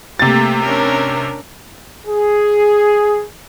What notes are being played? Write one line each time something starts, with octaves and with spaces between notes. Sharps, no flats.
C3 A3 A#3 G4 A6
C#4 D4 A#4
G#4